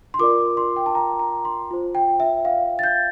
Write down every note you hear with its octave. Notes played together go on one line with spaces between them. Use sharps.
C6
F4 A#4 D5 D6
C6
G5
A5
A#5
A#5
C6
F4 C5
G5
E5
F5
A6
G6